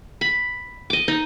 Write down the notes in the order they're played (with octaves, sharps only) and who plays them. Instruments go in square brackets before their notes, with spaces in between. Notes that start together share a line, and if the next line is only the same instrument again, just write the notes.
[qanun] B5
D#5 D6
D#4